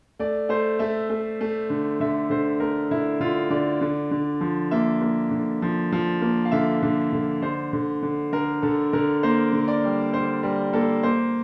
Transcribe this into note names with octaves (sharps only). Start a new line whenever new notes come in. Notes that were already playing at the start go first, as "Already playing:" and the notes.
A3 D5
A3 C5
A3 E5
A3
A3
D3
D3 E5
D3 C5
A3 A#4
D3 E4
D3 F4
D3 D5
D3
D3
F3
A#3 E5
A#3
D3
F3
F3
A#3
F5
D3 E5
D3
D3
D3 C5
D3
D3
D3 A#4
D3 A4
D3 A#4
A#3 C5
D3
D5
G3
D3 C5
G3 A#4
A#3 A4
A#3 C5